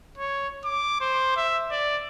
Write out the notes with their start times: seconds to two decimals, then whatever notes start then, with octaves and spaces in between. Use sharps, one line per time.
0.18 C#5
0.65 D6
1.01 C5
1.36 E5
1.71 D5